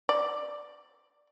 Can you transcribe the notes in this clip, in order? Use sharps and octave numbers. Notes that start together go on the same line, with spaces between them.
D5